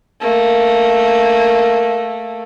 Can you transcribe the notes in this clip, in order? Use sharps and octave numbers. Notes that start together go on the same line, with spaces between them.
A3 A#3